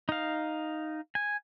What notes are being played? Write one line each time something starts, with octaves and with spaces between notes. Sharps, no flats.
D#4 F5
G#5